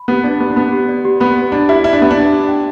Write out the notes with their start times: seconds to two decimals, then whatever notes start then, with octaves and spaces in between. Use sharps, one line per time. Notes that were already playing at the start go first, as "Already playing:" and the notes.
Already playing: B5
0.08 B3 G4
0.24 D4 D5
0.40 B3 G4
0.50 D4
0.56 B3 B5
0.73 G4
0.89 D5
1.05 G4
1.20 B3 B5
1.37 G4
1.52 D4 D5
1.68 E4 G4
1.84 E4 B5
1.93 D4
2.01 B3 G4
2.11 D4
2.16 D5
2.33 G4
2.48 G5